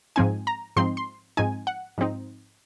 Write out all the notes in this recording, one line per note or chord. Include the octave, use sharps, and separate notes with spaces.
G#2 F3 C4 D#4 G#5
A#5
G#2 F3 C4 D#4 C6
C6
G#2 F3 C4 D#4 G#5
F#5
G#2 F3 C4 D#4